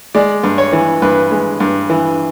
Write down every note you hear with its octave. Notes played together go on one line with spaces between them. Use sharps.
G#3 D5
G2
C#5
E3
G2 B4
G#3
G2
E3